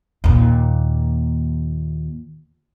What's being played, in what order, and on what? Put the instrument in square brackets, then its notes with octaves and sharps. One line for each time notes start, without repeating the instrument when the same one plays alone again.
[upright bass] D#2 A#2